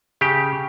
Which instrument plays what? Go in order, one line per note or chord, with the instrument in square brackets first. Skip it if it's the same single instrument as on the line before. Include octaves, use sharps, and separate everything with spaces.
[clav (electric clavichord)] C#3 G4